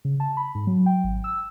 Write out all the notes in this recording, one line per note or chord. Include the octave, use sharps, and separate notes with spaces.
C#3
A5
B5
G#2
F#3
G5
G#1
E6